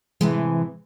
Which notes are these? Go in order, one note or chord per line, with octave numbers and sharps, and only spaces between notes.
A2 C3 E3 G#3